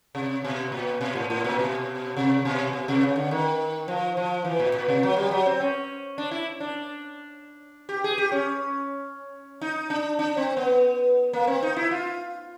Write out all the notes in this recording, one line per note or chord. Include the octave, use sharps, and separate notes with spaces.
C3
B2
A#2
B2
A2
A2
A#2
B2
C3
B2
B2
C3
C#3
D3
D#3
F3
F3
E3
A#2
A#2
C3
F#3
G3
F#3
C4
C#4
D4
E4
D4
G4
G#4
G4
C#4
D#4
D4
D4
C4
B3
A#3
C4
D#4
E4
F4